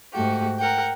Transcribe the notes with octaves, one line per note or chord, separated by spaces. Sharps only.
G#2 A3 F#4 G4
A#4 F#5 G5